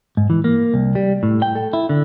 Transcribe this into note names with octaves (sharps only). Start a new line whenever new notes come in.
G#2
E3
A#3
C2
G3
A2
G5
A4
E4
D3